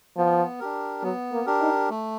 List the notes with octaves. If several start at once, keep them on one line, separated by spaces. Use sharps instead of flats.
F3 B3
D4 G4 A#4
F#3 B3
A#3
D4 G4 A#4
D#4
A3